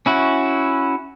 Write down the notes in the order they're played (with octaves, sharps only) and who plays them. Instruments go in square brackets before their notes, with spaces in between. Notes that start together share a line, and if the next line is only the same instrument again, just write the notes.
[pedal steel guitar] C#4 E4 F#4